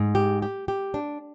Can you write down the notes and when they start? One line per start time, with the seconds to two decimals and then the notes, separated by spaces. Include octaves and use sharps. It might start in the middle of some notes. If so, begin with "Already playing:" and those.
Already playing: G#2
0.15 G4
0.42 G4
0.68 G4
0.94 D4